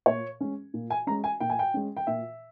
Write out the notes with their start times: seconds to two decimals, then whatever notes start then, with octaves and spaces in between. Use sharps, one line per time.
0.06 A#2 C#5
0.40 G#3 C#4
0.74 A#2
0.90 G#5
1.07 G#3 C#4 A#5
1.24 G#5
1.40 A#2 G5
1.50 G#5
1.59 G5
1.74 G#3 C#4
1.97 G5
2.07 A#2 E5